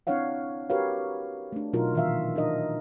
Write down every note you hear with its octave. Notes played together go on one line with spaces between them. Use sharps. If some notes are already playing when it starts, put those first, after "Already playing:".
C4 D4 E4 C#5 F5 F#5
F#4 G4 A#4 B4 C#5 F5
A3 D4
B2 F#3 D#4 F4 F#4 A#4
A#2 D#3 E3 F4 E5 F5
D4 D#4 A#4 D#5